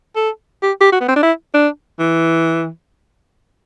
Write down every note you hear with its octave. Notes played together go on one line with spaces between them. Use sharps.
A4
G4
G4
F#4
B3
C4
D4
E4
D4
E3